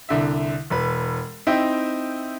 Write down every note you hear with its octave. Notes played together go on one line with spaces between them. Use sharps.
C2 D3 E5
E1 B4
C4 D#4 E4 E5 G5